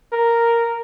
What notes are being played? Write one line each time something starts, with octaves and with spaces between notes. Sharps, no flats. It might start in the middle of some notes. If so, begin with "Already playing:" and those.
A#4